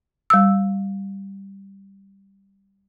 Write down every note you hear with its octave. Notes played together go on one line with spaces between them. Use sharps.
G3 E6